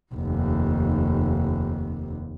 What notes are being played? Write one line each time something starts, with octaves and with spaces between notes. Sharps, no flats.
F1 D#2